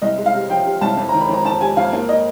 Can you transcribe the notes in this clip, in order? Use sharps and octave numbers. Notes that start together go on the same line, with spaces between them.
C2 D#5
G#3
F5
C3
F3 G5
C3
C2 A5
F2
A#5
D#3
B5
F2 A#5
F2 A5
C3 G#5
F2 F5
A#3
D#5